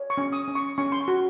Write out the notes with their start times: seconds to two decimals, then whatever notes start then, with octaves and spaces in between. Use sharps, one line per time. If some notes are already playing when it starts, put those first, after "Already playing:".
Already playing: C#5
0.10 C#6
0.18 C#4
0.33 D#6
0.48 C#4
0.55 C#6
0.78 C#4 C#6
0.92 C6
1.01 C#6
1.08 F#4